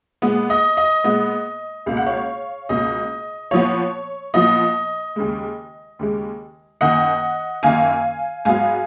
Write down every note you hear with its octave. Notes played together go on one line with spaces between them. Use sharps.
A#2 G#3 B3
D#5
D#5
A#2 G#3 B3
C#2 B2 A#3 F5
F#5
C#5 F5
C#2 B2 A#3 D#5
A#2 F3 B3 C#5
A#2 F3 B3 D#5
D#2 C#3 G#3
D#2 C#3 G#3
F#2 D#3 A#3 D#5 F#5
F#2 D#3 A#3 F5 G#5
G#2 F#3 B3 F5 G#5